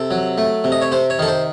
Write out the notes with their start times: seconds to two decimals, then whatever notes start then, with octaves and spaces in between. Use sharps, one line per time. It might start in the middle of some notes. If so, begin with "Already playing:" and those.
Already playing: C3 A4
0.11 F#3
0.38 A3
0.64 C3
0.72 D#5
0.81 C#5
0.92 C3 C5
1.10 C#5
1.19 D#3 A4
1.28 C5